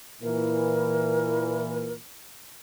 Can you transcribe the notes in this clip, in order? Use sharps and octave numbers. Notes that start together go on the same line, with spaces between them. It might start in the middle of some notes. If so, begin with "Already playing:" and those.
A#2 E3 A#4